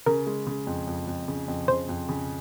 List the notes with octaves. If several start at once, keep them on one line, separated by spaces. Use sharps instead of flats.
C#3 A#4
G#3
C#3
F2
F2
F2
C#3
F2
C#3 C5
F2
C#3